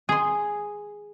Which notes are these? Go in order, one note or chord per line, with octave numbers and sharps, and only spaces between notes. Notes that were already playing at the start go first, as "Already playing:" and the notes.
G#4 C6